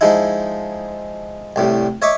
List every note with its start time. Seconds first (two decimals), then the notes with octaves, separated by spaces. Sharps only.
0.01 F3 G#3 D#4 E4
1.56 C2 A2 G3
2.02 C#5 D#5 E5 C#6 D6